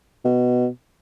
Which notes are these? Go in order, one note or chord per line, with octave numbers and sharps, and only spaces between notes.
B2